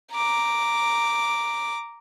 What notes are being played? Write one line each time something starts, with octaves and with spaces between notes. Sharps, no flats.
A#5 D6